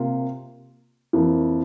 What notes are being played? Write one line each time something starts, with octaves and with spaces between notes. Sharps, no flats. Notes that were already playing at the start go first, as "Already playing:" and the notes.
Already playing: C3 A#3 F4
F2 E3 A#3